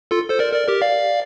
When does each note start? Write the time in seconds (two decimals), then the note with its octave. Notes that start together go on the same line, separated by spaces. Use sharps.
0.11 F4 A4
0.30 A4 C5
0.39 A#4 D5
0.53 A#4 D5
0.67 G4 A#4
0.82 D5 F5